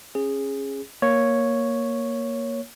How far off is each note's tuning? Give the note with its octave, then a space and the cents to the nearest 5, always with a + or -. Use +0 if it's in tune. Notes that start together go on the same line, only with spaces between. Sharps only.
C#4 -20 G#4 -10
A#3 +5 C#5 +0